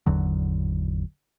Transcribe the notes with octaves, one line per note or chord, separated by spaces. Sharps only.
G#1 E2 D3 F#3